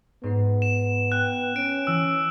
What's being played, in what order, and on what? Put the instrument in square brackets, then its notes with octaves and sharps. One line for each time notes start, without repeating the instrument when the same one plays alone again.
[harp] G#2 C7 [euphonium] B3
[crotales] E7
[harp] G5 [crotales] F#6
[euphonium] C#4 [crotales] D7
[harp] E3 [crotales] E6